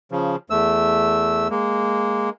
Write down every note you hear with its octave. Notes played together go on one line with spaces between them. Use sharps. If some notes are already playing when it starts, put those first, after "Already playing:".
C#3 F3
E2 A3 E6
G#3 A#3